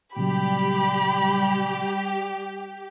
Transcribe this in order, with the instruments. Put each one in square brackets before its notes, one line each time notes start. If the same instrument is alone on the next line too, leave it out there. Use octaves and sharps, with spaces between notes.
[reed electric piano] A#2 C#3 F#3 [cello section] G3 [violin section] G4 [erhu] B5